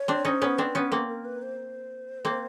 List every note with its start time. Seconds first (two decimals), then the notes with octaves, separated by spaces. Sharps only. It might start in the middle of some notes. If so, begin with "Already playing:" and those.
Already playing: C#5
0.08 C4 D4
0.25 C#4 D#4 C5 C#5
0.42 B3 C#4
0.58 C4 D4 B4
0.75 B3 C#4
0.92 A#3 C4 A#4
1.08 A#4
1.25 B4
1.42 C5
2.25 A#3 C4